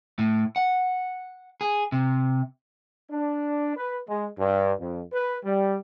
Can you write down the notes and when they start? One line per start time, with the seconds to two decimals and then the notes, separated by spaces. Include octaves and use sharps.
0.19 A2
0.56 F#5
1.61 G#4
1.92 C3
3.11 D4
3.76 B4
4.09 G#3
4.38 G2
4.79 F2
5.12 B4
5.44 G3